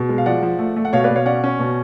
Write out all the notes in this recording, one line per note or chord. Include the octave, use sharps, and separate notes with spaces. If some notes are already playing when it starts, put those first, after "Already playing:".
Already playing: B2 G#4
G#3
F5
F3 D5 F#5
F3
A3
A3
F#5
B2 C#5 F5
B4 D5
B2
C#5 F5
C#4 D5 F#5
C#4
B2